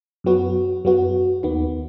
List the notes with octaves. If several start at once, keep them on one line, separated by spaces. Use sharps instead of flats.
F#2 F#3 B3 F#4
F#2 F#3 B3 F#4
D#2 D#3 B3